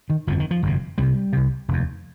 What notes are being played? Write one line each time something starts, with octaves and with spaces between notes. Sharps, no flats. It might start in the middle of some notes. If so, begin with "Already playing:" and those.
D#3
G1 F2 C3 F3
D#3
F3
G1 F2 C3
C2 C3 G3
C2 C3
F1 D#2